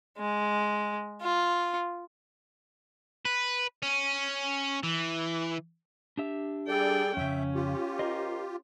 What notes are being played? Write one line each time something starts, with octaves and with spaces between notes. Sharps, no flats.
G#3
F4
B4
C#4
E3
D4 G4 E5
G3 G#4 A4 D5 G5
F2 C#3 C#4 E5
F4 G4
A#4 C5 D#5